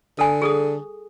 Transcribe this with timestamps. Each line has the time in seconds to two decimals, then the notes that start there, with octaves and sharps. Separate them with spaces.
0.19 D3 A4 G#5
0.42 G#4 A4 D#6